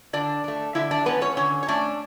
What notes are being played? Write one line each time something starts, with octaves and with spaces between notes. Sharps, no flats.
D3 D4 D5
A3 D4
D3 E4 E5
D4 D5
A3 B3 C#4 B4
C#4 C#5
D3 C#4 C#5
C#5
A3 C#4 D4 D5